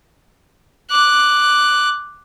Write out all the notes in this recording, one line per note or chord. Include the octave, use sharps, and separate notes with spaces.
D6 F#6